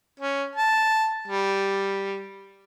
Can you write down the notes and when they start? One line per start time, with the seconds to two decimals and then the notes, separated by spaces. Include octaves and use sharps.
0.20 C#4
0.56 A5
1.28 G3